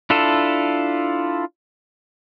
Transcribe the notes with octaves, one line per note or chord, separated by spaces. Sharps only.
D4 E4 F4 A4